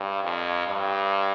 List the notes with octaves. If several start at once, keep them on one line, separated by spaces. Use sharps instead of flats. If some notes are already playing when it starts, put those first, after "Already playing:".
Already playing: G2
F2
G2